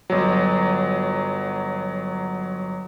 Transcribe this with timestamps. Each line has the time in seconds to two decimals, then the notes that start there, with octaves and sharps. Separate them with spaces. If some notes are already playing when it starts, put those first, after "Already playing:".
0.10 G1 F#3